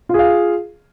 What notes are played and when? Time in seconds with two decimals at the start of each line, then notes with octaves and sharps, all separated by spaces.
0.09 F4
0.14 G#4
0.19 F5